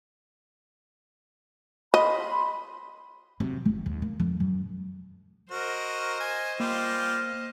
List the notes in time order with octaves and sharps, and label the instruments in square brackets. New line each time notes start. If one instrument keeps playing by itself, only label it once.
[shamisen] D#5 [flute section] B5 C6
[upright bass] C3 F#3
F#1
D#2
A#3
F2
F#2
[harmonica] F#4 A#4 [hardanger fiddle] C5 D#5
[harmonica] G#5
[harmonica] G3 F4 G4 [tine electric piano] A#3